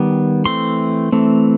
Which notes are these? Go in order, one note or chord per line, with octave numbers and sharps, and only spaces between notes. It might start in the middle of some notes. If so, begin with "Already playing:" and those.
Already playing: D#3 G3 B3
E3 A3 C4 C6
E3 A3 C4